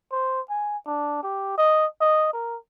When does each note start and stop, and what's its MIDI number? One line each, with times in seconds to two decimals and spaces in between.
0.12 0.41 72
0.50 0.77 80
0.87 1.19 62
1.23 1.58 67
1.58 1.86 75
2.01 2.31 75
2.33 2.56 70